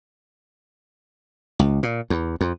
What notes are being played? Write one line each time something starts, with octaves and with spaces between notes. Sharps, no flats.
C#2
A#2
E2
F2